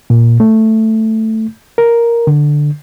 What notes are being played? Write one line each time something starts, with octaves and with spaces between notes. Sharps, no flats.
A#2
A3
A#4
D3